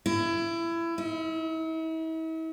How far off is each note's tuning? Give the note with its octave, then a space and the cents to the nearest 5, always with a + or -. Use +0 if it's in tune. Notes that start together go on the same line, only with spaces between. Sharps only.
E4 +25
E4 -40